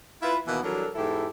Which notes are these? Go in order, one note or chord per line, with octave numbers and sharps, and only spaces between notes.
E4 F4 B4
B2 D#3 E3 A#3 B3
E3 F#3 G3 D4 A4 A#4
E2 G#2 E4 G4 A4